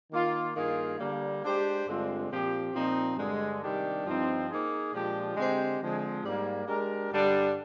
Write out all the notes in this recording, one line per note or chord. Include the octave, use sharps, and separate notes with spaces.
D#3 A#3 F4
G2 D#3 A#3 F4 G#4
D3 G3 A#3
G#3 D4 G4 C5
G2 D3 G#3 C4 F4
A#2 F3 C4 G4
A#2 F3 C4 D#4
G2 D3 G#3
C3 D#3 G3 D4 G4
G2 F3 C4 D#4
A#3 D#4 G#4
A#2 F3 G#3 D4 G4
D3 G#3 C4 G4 C5
D3 F3 G#3 C4
G#2 G3 A#3
G#3 D4 G4 A#4
G2 D3 G3 D4